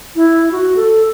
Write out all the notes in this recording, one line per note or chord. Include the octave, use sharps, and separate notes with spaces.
E4
F#4
A4